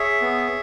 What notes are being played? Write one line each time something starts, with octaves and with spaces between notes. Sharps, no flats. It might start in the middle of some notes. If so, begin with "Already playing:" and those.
Already playing: G#4 C#5 E5
B3